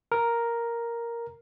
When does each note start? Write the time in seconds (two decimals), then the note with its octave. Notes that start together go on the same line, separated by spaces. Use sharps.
0.12 A#4